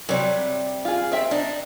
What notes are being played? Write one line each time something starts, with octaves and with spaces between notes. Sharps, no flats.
C3 F#3 G3 C4 C#5
F4 G#4
C4 E5 G5
D4 D#4